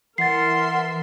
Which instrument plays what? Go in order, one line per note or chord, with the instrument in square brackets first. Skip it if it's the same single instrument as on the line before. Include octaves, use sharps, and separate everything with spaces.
[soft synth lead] E3 [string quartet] A#4 E5 C6 [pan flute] F#5 [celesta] A6 C7